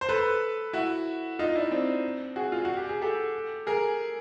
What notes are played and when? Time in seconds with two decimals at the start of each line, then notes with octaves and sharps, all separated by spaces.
0.01 C5
0.09 A4 B4
0.73 E4 F#4
1.39 D#4 F4
1.55 D4 E4
1.71 C4 D4
2.36 F#4 G#4
2.52 F4
2.65 F#4
2.77 G4
2.89 G#4
3.02 G4 A4
3.67 G#4 A#4